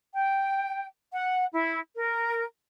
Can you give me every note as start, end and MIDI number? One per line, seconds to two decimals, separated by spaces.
0.15 0.86 79
1.13 1.44 78
1.52 1.79 64
1.96 2.43 70